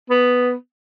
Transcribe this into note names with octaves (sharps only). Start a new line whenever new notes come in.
B3